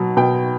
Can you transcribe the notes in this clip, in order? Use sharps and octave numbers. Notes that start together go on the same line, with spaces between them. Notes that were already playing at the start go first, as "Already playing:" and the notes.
Already playing: B2 F#3
B2 G5